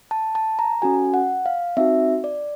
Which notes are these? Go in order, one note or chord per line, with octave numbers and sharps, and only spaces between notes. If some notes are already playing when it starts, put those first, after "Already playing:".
A5
A5
A#5
C#4 F#4 A4 G#5
F#5
F5
C4 D#4 F#4 E5
D5